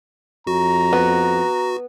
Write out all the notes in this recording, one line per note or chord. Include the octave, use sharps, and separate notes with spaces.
F2 F#4 A#5
B3